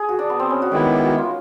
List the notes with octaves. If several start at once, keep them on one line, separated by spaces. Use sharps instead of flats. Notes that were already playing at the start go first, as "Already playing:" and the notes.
Already playing: G#4
F#4
D4
B3
C4
C#4
F#4
D#3 G#3 B3 E4 G4
G4
F#4
F4